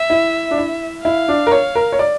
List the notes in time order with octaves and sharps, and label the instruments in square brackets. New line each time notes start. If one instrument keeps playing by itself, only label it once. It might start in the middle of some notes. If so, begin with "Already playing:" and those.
Already playing: [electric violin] E5
[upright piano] E4
D4
E4
[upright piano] E4 [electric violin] F5
[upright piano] D4
A#4
C#5
A#4
C#5
D5